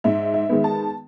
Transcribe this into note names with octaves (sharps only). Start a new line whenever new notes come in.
G#2 E5
E5
D#3 G#3 B3
A5